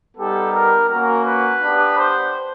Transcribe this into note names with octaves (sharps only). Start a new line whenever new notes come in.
G3 B3 D#4 G4 A4
A#4
A#3 C#4 F#4 A#4
B4
B3 D4 G4
C5